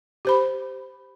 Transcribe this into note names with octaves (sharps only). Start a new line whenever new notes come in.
G4 C5 B5